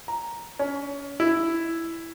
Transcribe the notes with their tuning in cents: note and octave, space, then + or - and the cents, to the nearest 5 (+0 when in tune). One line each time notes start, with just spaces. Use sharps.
A#5 +0
C#4 +25
E4 +5